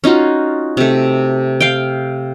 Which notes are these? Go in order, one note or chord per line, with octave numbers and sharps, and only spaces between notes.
C#4 D#4 F4 F#4
C3 A3
F5 G5